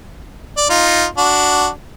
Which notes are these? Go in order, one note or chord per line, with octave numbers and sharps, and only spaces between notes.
D5
D#4 F4
D4 F#4